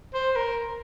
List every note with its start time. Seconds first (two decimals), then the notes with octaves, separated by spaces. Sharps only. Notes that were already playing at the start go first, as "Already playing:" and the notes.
0.14 C5
0.36 A#4